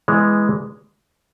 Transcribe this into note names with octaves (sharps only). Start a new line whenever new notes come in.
E3 G#3 B3